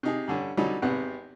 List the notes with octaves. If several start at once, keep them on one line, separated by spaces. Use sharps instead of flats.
C3 D#4 G#4
G2 D3 C#4
D3 F#3 G3 C4 C#4 D#4
G#1 C3 B3 F#5